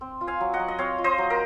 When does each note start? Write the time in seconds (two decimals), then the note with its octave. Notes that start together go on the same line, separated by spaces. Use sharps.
0.01 C4
0.21 F4
0.27 F5 G#5
0.41 F#3
0.53 D#5 F#5
0.59 F#3
0.68 D#5
0.78 C4 C#5 F5
0.98 F4
1.04 C5 D#5
1.18 F#3
1.30 A#4